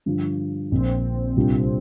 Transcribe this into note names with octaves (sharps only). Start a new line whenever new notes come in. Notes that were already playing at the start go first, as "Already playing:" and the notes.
G2 D3 F3
A#1 A#2 F3 C4
C2 A#2 G3 D4 F4